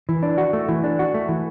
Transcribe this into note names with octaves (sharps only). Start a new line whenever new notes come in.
E3
D4
F#4
A3
E3
D4
F#4
A3
E3